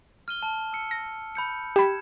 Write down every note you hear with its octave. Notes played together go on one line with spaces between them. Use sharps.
F6 D#7 G7
A5
E6 C#7
A#6
B5 G6 C#7
G4 B5 G#6 E7